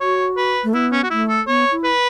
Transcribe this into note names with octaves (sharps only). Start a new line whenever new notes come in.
F#4 C#5
B4
A3
B3 E4
C#4
F#4
A3 E4
A4
B3 C#5
E4
B4